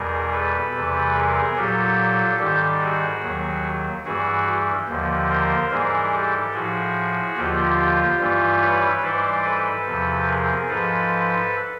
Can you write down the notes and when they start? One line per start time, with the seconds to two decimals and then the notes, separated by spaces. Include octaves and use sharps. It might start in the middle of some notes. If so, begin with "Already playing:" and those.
Already playing: E2 B2 G3 G#4 A#4
0.32 A4 B4
0.74 E2 C3 E3 G3
1.15 G#4 A#4
1.56 A#2 F#3 G4 A4
2.40 G#2 D#3 G3 G4 A4
2.81 F#4 G#4
3.23 D#2 D#3 F#3
4.05 G2 E3 G3 F#4 G#4
4.88 D#2 D3 F3
5.30 A#4 C5
5.71 G#2 E3 G3 G#4 A#4
6.12 G4 A4
6.54 A2 F3 F#4 G#4
7.36 D#2 D3 F3 F4 G4
8.20 G2 E3 G3
8.61 B4 C#5
9.02 G#2 E3 G3 C5 D5
9.44 A4 B4
9.86 E2 C3 F3
10.27 G#4 A#4
10.68 G#2 F3 A4 B4